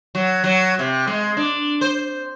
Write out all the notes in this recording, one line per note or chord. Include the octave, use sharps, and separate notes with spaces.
F#3
F#3
C3
G#3
D4
C5